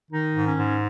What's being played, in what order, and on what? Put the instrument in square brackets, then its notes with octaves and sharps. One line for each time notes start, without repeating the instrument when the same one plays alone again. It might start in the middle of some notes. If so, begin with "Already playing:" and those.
[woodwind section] D#3 D#4
G#2
C#4
G#2